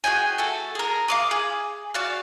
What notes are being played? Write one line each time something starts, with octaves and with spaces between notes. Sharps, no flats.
F#4 G#4 G5 G#5
A3 F#4 A4
G#4 A#4
F5 D6 D#6
G#4
F#4 D5 F5